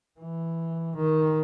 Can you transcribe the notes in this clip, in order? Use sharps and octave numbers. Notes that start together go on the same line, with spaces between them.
E3
D#3